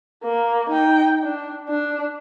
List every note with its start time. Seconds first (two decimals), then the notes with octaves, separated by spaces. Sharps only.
0.23 A#3
0.69 D#4 G5
1.23 D4
1.69 D4